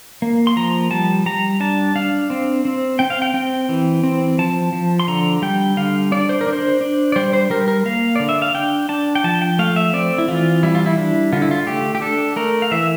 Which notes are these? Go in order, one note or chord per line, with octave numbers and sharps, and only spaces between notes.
A#3
C6
F3 A#5
G3 A5
G3 A#5
D4 A5
D4 F5
C4
C4
C4 G5
F5
G5
C4 G5
E3
C4
F3 A5
F3
C6
D3 A#5
G3 G5
D3 F5
D4 D5
C5
A#4
D4
C5
D4
D5
G3 C5
C5
G3 A#4
A#4
A#3 F5
D3 D5
E5
F5
D4 G5
D4 A5
G5
F3 A5
G5
A3 F5
E5
C4 D5
E4
E3 F4
G3 E4
F4
E4
D4
D3 F4
E4
F4
A3 G4
G4
D4 A4
A3 A#4
F5
E3 E5